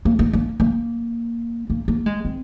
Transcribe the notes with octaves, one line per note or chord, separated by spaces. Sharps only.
A#3
A#3
A#3
A#3
A#3
A#3
G#3
C4